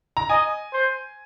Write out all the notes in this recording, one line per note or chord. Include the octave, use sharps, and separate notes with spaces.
A#5
D#5 G#5
C5